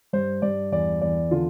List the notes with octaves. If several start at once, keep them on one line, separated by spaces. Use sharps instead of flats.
G2 C5
G2 D5
E2 D5
E2 D5
D3 F4